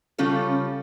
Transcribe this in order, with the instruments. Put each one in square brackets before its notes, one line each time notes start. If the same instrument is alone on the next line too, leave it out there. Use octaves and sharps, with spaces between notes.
[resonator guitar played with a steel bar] C#3 G3 C#4 F4 A4